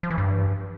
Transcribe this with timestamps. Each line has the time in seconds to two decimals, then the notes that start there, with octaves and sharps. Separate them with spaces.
0.03 F3
0.11 E3
0.18 G2